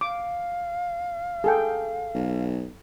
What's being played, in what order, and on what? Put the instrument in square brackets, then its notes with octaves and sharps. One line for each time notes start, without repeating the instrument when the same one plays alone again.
[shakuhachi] F5 [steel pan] D6
[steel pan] G#4 A4 G5
[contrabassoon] B1